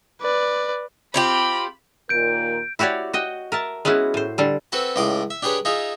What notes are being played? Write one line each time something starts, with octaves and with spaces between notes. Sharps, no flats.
B4 D5
C4 F4 G4 B5
D#2 A#2 A#4 G6 D7
E4 F#4 G4 C#5 D5
F#4 D#5 G5
A#4 E5 A5
G#3 B3 C#4 E4 F#4
A2 C5
D3 G3 A4
C4 F#4 A4 B4 A5
C#2 A2 D5 C6 D6 D#6
E5
D4 G4 G#4 B4 C#5
D#4 F4 G#4 E5